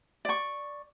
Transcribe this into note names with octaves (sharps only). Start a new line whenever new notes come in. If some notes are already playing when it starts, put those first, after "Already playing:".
D5 C#6